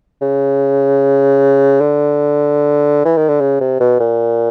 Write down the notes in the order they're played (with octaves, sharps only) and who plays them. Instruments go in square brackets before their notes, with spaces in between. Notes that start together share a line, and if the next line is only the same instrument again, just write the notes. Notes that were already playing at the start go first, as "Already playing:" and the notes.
[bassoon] C#3
D3
E3
D#3
D3
C#3
C3
B2
A#2